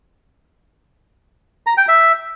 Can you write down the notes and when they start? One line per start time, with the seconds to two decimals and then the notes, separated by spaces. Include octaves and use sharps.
1.67 A#5
1.77 G5
1.88 E5